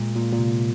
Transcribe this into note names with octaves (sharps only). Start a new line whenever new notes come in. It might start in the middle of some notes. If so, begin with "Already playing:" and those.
Already playing: A#2 G#3
A#2
A#2
C3